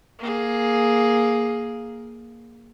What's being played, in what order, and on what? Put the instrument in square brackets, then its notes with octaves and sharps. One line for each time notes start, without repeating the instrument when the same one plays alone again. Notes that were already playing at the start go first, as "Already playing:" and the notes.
[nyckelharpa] A#3 G#4